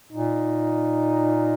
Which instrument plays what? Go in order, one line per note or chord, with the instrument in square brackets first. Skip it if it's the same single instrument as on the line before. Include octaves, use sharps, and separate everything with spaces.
[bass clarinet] A#2 [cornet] D#4